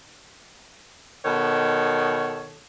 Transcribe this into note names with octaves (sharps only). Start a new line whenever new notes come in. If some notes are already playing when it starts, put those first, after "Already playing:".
B2 D#3 A4 C#5